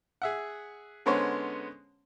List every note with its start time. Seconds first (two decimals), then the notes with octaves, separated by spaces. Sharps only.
0.22 G#4 E5 F#5
1.06 D3 G#3 B3 C#4 C5 C#5